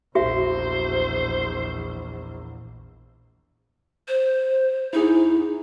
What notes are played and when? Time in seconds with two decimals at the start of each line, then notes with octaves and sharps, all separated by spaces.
0.15 A#1 E2 F#4 C5 E5
4.08 C5
4.93 D#4 E4 G#4